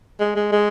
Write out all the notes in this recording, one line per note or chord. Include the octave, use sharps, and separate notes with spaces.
G#3
G#3
G#3